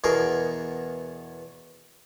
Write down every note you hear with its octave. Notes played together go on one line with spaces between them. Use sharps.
E2 B2 G#4 A#4